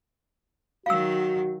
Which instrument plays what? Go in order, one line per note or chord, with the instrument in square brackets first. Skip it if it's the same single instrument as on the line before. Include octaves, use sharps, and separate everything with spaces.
[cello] D#3 F#3 [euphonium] F#4 [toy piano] F5 E6